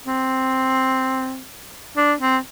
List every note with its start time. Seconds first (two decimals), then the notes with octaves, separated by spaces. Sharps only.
0.07 C4
1.97 D4
2.21 C4